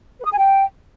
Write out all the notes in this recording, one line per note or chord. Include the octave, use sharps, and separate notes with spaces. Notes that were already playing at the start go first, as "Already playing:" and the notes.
B4
D#6
G#5
G5